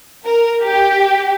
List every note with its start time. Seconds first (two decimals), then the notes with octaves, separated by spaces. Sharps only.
0.24 A#4
0.63 G4